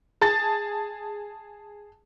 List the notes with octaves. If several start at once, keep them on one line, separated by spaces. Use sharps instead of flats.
G#4 A5 A6